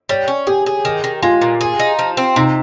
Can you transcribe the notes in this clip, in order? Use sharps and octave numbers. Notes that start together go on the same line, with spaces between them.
G3 C#5
C#4
G4 G#4
G#4
D#3
D#3
G#3 F4
A#2
G#4
D#4
F3
C4
C3 D#4